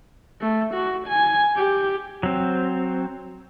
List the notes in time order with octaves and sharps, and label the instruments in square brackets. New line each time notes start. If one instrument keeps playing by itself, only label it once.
[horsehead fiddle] A3
F#4
G#5
G4
[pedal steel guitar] F#3 C4